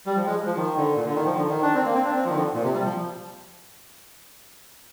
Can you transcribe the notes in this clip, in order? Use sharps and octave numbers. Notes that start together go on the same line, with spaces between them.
G3
F3
G#3
F3
D#3
D3
A#2
D3
D#3
F3
D3
D#3
D4
C4
A#3
C4
D4
C4
F3
D#3
D3
A#2
C3
G3
F3